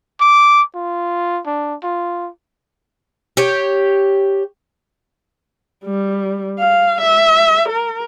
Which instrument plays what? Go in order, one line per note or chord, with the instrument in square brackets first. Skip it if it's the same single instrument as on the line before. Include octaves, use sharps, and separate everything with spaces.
[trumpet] D6
F4
D4
F4
[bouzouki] G4 C#5
[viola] G3
F5
E5
A#4